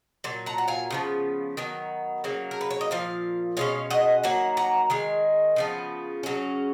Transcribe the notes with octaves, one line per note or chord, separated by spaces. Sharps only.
A#2 F#3
F#5 A#5
F#5
F5 G#5
C#3 F3 B3
D#3 F#3 B3
C#3 F#3 A#3
A#4
B4
C#5
D#5
A#2 F3 F5
B2 G#3 C#4 C#5 F5
D#5 F#5
D#3 F#3 A#3 F#5 A#5
F#5 A#5
D#3 G#3 G#5
C#3 F3 B3
C#3 F#3 C#4